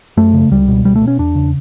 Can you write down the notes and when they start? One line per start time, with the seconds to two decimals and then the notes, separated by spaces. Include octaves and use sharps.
0.17 F#2 A3
0.33 C#3
0.51 C#2 G3
0.68 B2
0.85 C#2 G3
0.96 A3
1.01 B2
1.08 C#4
1.19 E2 D4
1.35 C#3